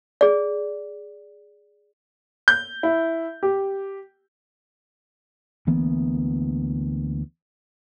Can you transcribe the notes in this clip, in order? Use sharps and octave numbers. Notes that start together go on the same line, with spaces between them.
G#4 D5
G6
E4
G4
D2 E3 A#3 B3